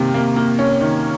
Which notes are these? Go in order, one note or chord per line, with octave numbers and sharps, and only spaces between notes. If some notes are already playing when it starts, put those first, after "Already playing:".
Already playing: C3 D#3 A#3
A#3
A#3
C#4
D#3